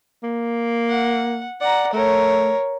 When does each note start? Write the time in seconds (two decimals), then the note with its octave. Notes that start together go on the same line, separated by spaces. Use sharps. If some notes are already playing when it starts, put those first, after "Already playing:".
0.23 A#3
0.89 F#5
1.61 D5 F#5 A#5
1.93 A3 A#4 C#5